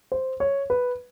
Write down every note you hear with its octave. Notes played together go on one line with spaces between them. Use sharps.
C5
C#5
B4